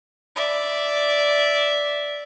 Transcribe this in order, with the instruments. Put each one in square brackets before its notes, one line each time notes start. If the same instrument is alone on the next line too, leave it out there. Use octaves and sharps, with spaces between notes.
[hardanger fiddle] D5 E5